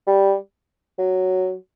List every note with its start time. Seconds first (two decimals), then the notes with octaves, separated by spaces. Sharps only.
0.07 G3
0.98 F#3